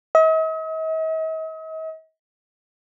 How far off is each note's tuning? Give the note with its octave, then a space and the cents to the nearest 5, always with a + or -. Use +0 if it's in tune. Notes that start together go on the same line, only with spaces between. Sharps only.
D#5 +45